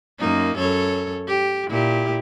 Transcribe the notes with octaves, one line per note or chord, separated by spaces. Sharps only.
F#2 A#3 D#4
F#2 A4 C#5
G4
A#2 E4 G4